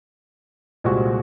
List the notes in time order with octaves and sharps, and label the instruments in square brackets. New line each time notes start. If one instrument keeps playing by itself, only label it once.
[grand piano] C2 A#2 G#3 C4 F#4